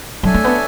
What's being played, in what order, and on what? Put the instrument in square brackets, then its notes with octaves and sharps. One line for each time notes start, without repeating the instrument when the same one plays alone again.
[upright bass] F#3 [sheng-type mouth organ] D4 A4 C#5 E5 G#5
[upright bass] A3
B3